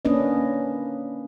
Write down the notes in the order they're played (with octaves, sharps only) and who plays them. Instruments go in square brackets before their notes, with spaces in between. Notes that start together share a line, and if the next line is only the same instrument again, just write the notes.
[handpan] A#3 C#4 D4 B4 D#5